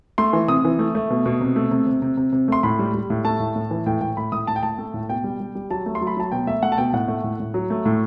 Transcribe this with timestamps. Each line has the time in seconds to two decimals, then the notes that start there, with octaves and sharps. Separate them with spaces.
0.18 A3 C6
0.33 E3
0.48 C3 D#6
0.65 E3
0.79 A3
0.95 A3
1.10 B2
1.26 B2
1.41 C3
1.56 A3
1.71 C3
1.87 C3
2.02 C3
2.17 C3
2.32 C3
2.48 A3 C6
2.63 A2 B5
2.79 G3
2.94 G3
3.10 A2
3.25 A3 A5
3.40 A2
3.55 A2
3.71 E3
3.86 A2 G5
4.01 A2 G5
4.17 A2 B5
4.32 A2 D#6
4.47 A2 A5
4.56 G5
4.63 A2 A5
4.78 A3
4.94 A2
5.09 B2 G5
5.24 G3
5.40 G3
5.55 G3
5.70 F#3 A5
5.86 A3
5.95 C6
6.01 F#3
6.07 B5
6.17 F#3 A5
6.32 B2 G5
6.47 A3 E5
6.62 A3 F#5
6.72 A5
6.78 B2 G5
6.93 A2 F#5
7.08 A3
7.24 A2
7.40 A2
7.54 F#3
7.70 A3
7.85 A2